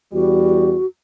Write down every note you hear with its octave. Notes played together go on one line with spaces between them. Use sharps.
E2 G3 F#4